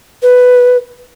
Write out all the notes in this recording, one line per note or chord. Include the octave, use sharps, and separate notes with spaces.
B4